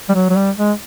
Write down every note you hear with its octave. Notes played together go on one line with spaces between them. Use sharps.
G3
F#3
F#3
G3
G#3